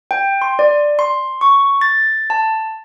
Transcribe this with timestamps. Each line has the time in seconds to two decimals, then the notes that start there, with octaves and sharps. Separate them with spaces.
0.11 G5
0.42 C6
0.59 D5
0.99 C6
1.41 C#6
1.81 A6
2.30 A5